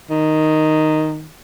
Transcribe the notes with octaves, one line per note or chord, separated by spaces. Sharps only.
D#3